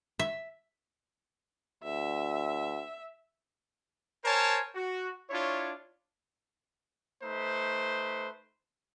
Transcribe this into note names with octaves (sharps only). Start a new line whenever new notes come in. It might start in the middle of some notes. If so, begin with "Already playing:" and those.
E5
D2 E5
A#4 C5 C#5 G#5 A5
F#4
D4 E4 F4 C#5
A3 D#4 B4 C5